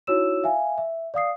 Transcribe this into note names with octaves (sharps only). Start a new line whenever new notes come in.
D#4 E4 F#4 C#5 E6 E7
E5 F5 G#5
E5
D5 F5 D#6 C7